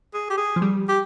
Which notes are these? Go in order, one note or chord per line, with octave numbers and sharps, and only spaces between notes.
G#4
G4
G#4
F3
G3
G4